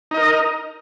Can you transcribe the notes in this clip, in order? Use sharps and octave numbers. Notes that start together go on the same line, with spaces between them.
D#4 A#4 D#5